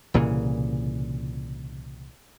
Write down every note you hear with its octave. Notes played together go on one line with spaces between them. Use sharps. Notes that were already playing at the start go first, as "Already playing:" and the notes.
C2 A#2 C#3 E3